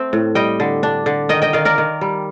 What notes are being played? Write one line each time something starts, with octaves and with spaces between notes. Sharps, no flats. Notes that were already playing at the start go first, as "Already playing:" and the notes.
Already playing: A3 C4
A2
G3 D#5 G5
D3
D4
D3
D#3 D#5 G5
D#5 G5
D#3 D5 F5
A#4 D5
D#3
G3